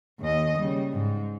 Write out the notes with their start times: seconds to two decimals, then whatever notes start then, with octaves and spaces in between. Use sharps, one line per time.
0.20 D#2 D#5
0.58 C#3 G3
0.92 G#2